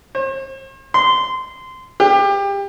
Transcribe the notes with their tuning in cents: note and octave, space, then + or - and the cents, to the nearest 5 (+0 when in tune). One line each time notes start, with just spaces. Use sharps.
C5 +45
C6 -20
G4 +25